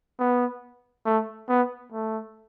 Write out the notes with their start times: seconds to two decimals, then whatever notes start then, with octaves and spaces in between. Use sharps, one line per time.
0.20 B3
1.06 A3
1.49 B3
1.93 A3